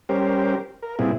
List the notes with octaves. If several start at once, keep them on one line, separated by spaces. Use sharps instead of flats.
G3 C#4 G4 A#4 C5
A#4
A#2 G3 B3 C4 E4 G#4